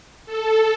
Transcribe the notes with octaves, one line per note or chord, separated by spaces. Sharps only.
A4